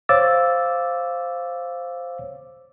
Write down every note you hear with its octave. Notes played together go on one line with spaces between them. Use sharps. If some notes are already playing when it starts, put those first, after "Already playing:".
C5 C#5 F5 D6 E6 A6